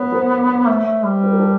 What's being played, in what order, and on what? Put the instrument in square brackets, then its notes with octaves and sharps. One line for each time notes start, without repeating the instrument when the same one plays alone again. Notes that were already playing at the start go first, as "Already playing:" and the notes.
Already playing: [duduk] B3 [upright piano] B4 C#5
[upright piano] A#4 C5
[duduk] A3
A3
G3
[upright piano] B4
A#4
A4 B4